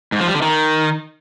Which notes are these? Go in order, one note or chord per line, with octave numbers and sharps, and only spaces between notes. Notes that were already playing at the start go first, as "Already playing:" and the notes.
G#2
F3
G3
D3
D#3